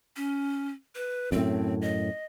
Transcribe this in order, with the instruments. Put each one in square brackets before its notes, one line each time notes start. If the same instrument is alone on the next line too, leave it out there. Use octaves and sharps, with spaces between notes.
[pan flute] C#4
B4
[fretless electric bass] F#2 A2 [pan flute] C4
[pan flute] D#5